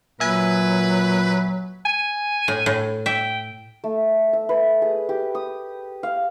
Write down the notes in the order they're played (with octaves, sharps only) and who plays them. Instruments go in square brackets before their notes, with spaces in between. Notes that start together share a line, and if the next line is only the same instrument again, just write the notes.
[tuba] A#2 [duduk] F#3 [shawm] B4 [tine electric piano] E5 G#5 G#6
[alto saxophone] G#5
[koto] A2
A2
[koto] E5 [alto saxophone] G5
[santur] A3
E5
B4
G#4
G4
D#6
F5